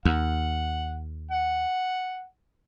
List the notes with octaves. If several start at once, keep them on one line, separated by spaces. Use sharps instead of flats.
D#2 F#5
F#5